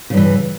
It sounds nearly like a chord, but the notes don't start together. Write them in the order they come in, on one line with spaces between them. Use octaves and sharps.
C#3 G2 E3